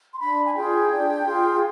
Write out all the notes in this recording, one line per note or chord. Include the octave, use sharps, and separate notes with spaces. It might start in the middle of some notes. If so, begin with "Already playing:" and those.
C6
D4 B5
G#5
F4 G#4 G5
D4
F4 G#4